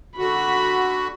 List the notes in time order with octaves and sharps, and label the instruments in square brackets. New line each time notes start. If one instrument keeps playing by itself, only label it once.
[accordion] D3 F#4 [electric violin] B5